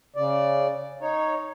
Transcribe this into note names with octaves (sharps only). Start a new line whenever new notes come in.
C#3 D5
D#4 C#5